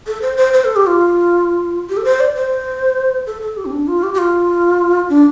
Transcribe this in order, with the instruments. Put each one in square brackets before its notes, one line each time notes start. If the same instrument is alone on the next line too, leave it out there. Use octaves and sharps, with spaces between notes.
[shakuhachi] A4
C5
C5
C5
A4
G4
F4
G4
A4
C5
D5
C5
A4
A4
G4
C4
D4
F4
G4
G4
F4
D4